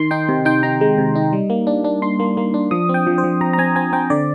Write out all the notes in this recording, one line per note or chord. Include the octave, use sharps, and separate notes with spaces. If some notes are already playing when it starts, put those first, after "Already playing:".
Already playing: D#3 C6
D#4 G5
C3
D#4 G5
D#4 A#5
G#3
C3
D#4
G3
A#3
D4
D4
D4 C6
A#3
A#3
D4
F3 D#6
C4
G5
F3
C5
F3
F3 A#5
A#5
C4 G#5
C4 G#5
C4 G5
D3 D5